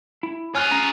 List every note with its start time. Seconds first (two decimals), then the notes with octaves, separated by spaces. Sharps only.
0.23 E4
0.55 F4 G#4 C#5 G#5 F6 F#6
0.71 C#4 A#5